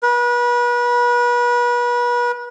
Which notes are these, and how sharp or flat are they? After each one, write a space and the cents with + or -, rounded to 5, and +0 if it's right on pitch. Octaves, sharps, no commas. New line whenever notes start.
B4 -35